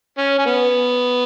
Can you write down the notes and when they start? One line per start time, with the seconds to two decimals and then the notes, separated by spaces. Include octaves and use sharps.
0.18 C#4
0.38 C#4
0.46 B3